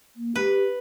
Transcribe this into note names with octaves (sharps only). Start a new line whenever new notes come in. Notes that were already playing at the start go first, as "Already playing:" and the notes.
A#3
G4 B4